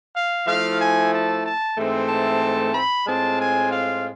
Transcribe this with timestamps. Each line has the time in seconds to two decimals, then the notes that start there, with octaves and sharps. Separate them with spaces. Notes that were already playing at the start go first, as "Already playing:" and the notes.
0.14 F5
0.46 F3 A3 E4 F5
0.80 G#5
1.12 A5
1.44 A5
1.77 G#2 E3 A3 C4
2.09 A5
2.75 B5
3.07 A2 G#3 C4 F4 A5
3.39 G#5
3.71 F5